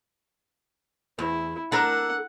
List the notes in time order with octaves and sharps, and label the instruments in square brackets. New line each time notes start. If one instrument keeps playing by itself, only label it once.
[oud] E2 [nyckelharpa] E4
[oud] D4 A4 A#4 [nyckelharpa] F#5